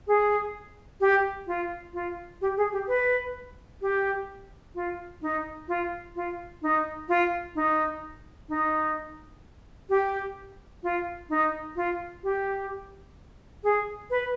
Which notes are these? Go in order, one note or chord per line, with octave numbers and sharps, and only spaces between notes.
G#4
G4
F4
F4
G4
G#4
G4
B4
G4
F4
D#4
F4
F4
D#4
F4
D#4
D#4
G4
F4
D#4
F4
G4
G#4
B4